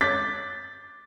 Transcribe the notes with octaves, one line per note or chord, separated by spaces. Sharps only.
D6 F#6 G6 A6 B6